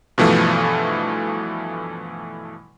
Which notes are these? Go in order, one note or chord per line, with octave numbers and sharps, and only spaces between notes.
G2 B2 E3 F3 A3